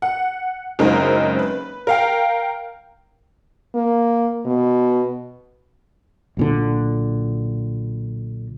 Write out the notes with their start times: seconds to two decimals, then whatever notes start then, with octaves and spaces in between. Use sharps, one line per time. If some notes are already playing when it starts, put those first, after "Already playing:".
0.02 F#5
0.79 F#1 F#2 G#3 C4 D#4 A#4
1.39 B4
1.87 A#4 F5 G5
3.75 A#3
4.45 B2
6.37 B1 A#2 D3